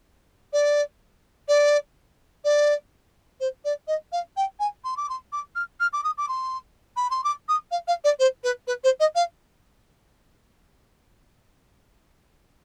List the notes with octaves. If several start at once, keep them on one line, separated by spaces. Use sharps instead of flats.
D5
D5
D5
C5
D5
D#5
F5
G5
G#5
C6
D6
C6
D6
F6
F6
D6
D#6
D6
C6
B5
C6
D6
D#6
F5
F5
D5
C5
B4
B4
C5
D#5
F5